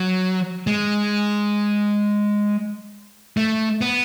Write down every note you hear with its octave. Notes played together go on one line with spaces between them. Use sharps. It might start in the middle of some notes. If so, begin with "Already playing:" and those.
Already playing: F#3
G#3
A3
B3